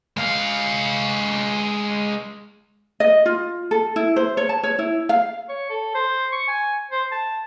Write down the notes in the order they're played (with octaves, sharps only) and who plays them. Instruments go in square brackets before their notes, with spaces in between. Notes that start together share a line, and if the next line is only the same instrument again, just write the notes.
[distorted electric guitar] G#3 F5
[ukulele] D#5
F4
A4
E4
C5
C#5
A5
C#5
E4
F5
[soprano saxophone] C#5
A4
C5
C#6
G#5
C5
A5